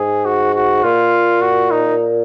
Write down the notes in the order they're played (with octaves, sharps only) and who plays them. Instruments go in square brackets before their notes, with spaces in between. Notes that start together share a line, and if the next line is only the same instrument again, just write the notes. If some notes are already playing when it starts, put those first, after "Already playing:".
Already playing: [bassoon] G#2 [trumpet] G#4
[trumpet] F#4
F#4
[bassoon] A#2 [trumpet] F4
[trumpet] F#4
D#4